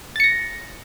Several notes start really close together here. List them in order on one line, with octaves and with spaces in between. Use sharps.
A6 C#7 A#6